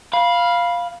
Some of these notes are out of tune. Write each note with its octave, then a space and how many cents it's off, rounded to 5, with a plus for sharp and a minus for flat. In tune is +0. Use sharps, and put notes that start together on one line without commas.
F5 +0 B5 -15